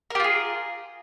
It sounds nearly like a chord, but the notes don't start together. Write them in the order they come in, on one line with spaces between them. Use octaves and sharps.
A#4 G4 F4 G#4